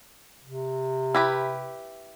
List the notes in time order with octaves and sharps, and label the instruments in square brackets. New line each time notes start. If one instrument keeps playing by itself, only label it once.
[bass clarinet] C3
[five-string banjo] E4 G4 B4